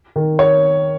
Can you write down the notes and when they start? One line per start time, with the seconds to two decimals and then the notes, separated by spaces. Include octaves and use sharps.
0.16 D#3
0.39 C#5